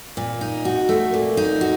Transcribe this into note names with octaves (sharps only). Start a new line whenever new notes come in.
A#2
D#4
F#4
A3
A#2
D#4
F#4